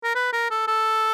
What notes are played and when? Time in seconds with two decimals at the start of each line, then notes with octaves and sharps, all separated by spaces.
0.04 A#4
0.15 B4
0.33 A#4
0.51 A4
0.68 A4